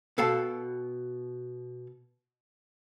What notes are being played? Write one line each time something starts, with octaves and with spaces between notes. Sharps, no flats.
B2 A4 F5 G5 A5